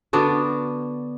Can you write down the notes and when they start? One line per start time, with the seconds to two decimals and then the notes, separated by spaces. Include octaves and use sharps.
0.13 D3 B3 D4 F#4